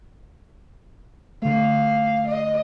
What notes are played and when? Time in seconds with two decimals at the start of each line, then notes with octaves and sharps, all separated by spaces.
1.42 D3 A3 F5
2.28 D#5